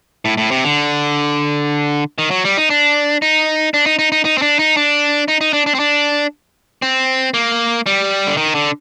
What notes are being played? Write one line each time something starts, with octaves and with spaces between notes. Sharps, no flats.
A2
A2
C3
D3
D#3
F#3
G3
D#4
D4
D#4
D4
D#4
D#4
D#4
D#4
C4
D4
D#4
D4
D#4
D#4
D4
D4
C4
D4
C4
A#3
G3
D3
D#3
D3